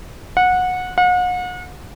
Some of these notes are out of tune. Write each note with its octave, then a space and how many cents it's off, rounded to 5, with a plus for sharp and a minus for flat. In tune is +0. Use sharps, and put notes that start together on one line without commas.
F#5 -20
F#5 -40